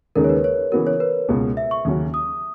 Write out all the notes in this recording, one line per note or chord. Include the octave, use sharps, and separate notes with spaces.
D#2 C#3 G#3 D#4 A#4
C#5
B4
C#5
C#3 E3 B3 F#4 A#4
C#5
B4
C#2 B2 G#3
E5
C#6
D#2 C#3 F#3 C#4 F#4
D#6